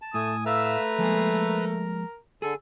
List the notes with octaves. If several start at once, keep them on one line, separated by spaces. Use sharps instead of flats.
A5
A2 A3 G#5 D#6
A3 B4 E5 F5 A#5 E6
F3 G#3 A#3 G#4 A4
A#4
D3 G#4 A4